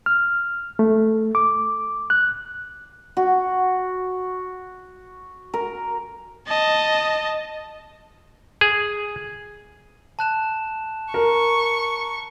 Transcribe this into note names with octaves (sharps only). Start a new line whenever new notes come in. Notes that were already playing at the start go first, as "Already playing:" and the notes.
F6
A3
D6
F#6
F#4
A#4
D#5 A5
G#4
A5 F#6 E7
A#4 C#6